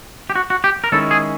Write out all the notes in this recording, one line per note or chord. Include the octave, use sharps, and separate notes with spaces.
G4
F#4
F#4
G4
A#4
D#3 G#3 C#4 E4 A4
G#4